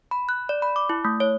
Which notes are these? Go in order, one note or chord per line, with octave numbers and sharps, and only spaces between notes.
B5
F#6
D5
B5
D6
E4
A3
C#5